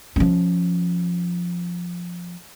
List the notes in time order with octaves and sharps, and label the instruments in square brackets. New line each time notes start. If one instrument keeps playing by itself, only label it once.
[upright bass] F3 C#4